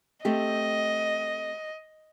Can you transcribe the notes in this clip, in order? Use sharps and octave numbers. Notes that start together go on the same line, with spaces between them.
A3 C4 G4 D#5